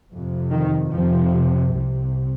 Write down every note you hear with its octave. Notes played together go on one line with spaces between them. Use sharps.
F2 C3
D#3
F2 C3 F3
C2 C3